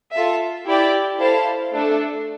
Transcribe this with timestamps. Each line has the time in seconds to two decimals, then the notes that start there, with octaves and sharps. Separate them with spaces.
0.12 F4 A4 E5
0.66 E4 G4 D5 G5
1.19 E4 A4 C5 F5 A5
1.73 A3 D4 A4